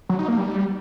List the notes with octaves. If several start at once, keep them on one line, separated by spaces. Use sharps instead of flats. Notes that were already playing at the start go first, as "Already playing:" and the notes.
F#3
D#4
A#3
G3